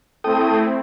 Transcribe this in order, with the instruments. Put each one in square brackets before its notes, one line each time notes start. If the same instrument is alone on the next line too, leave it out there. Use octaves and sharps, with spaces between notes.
[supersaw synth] A3 C4 E4 [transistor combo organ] A4 G5 D#6